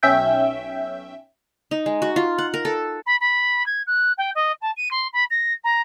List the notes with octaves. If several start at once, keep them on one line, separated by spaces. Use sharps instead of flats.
B1 C#4 E5 G5 G6
D#4
G#3
F#4
F4
F#5
A#4
A4
B5
B5
G#6
F#6
G5
D#5
A5
D#7
C6
B5
A#6
A#5